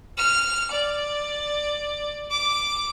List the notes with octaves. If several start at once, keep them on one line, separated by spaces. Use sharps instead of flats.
F6
D5
D6